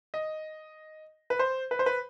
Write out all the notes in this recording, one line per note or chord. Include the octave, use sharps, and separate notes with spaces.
D#5
B4
C5
B4
C5
B4